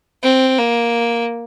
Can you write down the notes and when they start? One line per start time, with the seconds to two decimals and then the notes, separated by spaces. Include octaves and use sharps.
0.23 C4
0.59 A#3